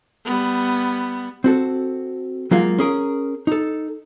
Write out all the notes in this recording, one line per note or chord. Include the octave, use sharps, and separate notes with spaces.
G3 B3
C4 F#4 A4
F#3 G#3 A#3 F4 F5
C#4 G#4 A#4
D#4 A4